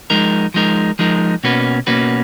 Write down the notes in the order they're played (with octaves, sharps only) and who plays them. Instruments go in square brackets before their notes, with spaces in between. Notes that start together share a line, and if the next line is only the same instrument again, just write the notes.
[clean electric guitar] F3 G#3 D#4 A#4
F3 G#3 D#4 A#4
F3 G#3 D#4 A#4
B2 A#3 C#4 F#4 B4
B2 A#3 C#4 F#4 B4